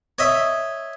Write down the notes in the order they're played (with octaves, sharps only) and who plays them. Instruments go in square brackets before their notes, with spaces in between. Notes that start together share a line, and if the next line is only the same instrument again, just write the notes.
[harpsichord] C#5 D#5 E5